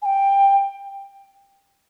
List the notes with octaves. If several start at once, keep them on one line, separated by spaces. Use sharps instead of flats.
G#5
G5